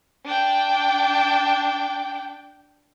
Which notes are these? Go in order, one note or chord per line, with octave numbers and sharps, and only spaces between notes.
D4 G5